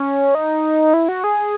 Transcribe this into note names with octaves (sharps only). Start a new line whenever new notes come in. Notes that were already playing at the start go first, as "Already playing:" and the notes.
Already playing: C#4
D#4
E4
F#4
G#4